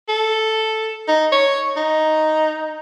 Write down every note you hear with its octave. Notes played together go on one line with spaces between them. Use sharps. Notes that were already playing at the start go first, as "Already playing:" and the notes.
A4
D#4
C#5
D#4